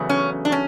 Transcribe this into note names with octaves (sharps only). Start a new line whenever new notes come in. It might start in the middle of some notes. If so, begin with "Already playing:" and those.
Already playing: E2 C#3 F#3 A3
C#4
D4
C#4